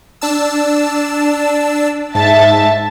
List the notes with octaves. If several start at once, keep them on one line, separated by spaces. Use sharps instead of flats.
D4 A5 E6
G#2 E5 A5 A6